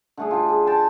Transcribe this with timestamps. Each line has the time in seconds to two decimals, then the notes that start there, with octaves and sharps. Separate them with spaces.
0.17 D3 A3 G#4
0.31 F4 G4
0.49 G#4
0.67 G5 A5 C6